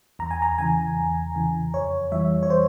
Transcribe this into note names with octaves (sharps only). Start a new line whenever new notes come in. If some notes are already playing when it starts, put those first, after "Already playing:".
E2 A#5
G#5
A#5
C#3 E3 G#5
E2
C#3 E3
F2 C#5
E3 G3 E5
C#5
C5